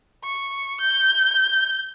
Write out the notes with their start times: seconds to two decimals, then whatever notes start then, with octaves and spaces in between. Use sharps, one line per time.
0.24 C#6
0.80 G6